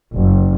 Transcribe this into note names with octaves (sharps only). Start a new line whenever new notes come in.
F#1